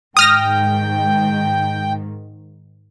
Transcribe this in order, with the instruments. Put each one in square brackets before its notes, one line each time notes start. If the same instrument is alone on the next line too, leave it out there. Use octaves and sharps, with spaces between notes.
[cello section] G#2 D#3 [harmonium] G5 [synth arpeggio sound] D#6 F6 A#6